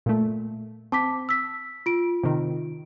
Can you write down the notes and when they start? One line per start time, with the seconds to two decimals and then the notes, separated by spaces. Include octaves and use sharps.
0.06 A#2 A3
0.92 C4 A5 D6 B6
1.29 E6 B6
1.86 F4 D7
2.23 C3 D#3